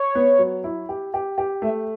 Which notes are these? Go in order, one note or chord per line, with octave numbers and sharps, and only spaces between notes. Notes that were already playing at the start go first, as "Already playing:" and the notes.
Already playing: C#5
B3
F#3
E4
G4
G4
G4
A3 E5